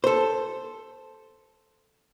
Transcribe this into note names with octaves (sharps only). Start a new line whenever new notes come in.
A4 C5